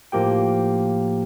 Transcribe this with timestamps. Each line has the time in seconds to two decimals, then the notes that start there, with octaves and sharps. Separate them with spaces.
0.12 A2 F3 A#3 G4 G5